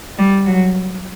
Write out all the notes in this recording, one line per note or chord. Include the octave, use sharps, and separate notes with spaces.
G3
F#3